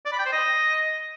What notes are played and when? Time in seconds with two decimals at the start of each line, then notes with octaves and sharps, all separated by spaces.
0.06 D5
0.12 B5
0.19 G5
0.26 C5
0.32 D#5